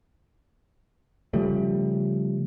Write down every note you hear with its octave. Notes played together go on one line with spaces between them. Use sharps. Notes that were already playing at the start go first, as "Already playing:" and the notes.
C#3 F3 G3 A3